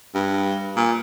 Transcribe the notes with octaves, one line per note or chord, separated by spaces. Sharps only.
G2
A#2